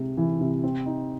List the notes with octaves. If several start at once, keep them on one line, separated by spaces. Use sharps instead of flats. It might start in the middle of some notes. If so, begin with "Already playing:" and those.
Already playing: C3 G#3
E3
C3
C4
D#4